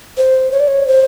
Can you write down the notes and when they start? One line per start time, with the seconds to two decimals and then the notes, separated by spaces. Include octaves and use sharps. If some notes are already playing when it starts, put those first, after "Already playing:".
0.17 C5
0.52 C#5
0.60 D5
0.68 C#5
0.87 C5